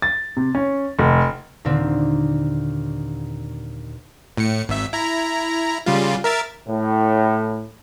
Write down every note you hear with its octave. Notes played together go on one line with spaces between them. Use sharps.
A6
C3
C#4
F1
D#2 A#2 D3 C4
A2 C#7
G#1 E5
E4 A#5
C#3 G3 F4
A#4 E5 A6
A2